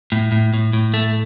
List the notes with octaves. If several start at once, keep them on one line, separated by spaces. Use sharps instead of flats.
A2
A2
A2
A2
A3